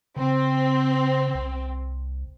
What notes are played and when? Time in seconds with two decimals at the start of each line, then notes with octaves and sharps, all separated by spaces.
0.16 C#3 C4
1.35 C2